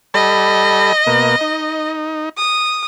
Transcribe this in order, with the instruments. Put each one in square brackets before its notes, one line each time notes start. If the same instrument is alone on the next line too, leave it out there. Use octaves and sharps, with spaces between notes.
[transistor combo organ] G3 A4 B5 [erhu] D#5
[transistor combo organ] B2 A#3
D#4
[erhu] D#6